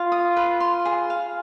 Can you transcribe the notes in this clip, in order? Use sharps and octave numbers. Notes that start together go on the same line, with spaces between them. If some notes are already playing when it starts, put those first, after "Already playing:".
Already playing: F4 F5
D#6
B4
C6
G#4
F5